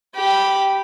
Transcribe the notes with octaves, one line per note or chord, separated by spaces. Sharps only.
G4 B5